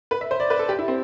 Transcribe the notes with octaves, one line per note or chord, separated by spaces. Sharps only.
B4
E5
C5
D5
B4
A4
G4
E4
C4